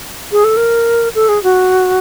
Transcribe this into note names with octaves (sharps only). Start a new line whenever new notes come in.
G#4
A4
A#4
A4
G#4
F#4